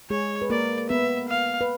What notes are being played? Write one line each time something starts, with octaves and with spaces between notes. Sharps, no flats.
G#3 G#4 C#5
B4
A#3 A#4 D5
B3 B4 E5
F5
B4